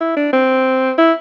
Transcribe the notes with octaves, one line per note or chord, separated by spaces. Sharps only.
E4
D4
C4
E4